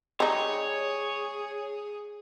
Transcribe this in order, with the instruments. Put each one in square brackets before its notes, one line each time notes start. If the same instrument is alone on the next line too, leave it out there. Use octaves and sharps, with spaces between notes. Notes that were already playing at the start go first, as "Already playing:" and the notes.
[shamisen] G3 D#4 [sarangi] G#4 [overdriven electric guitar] C#5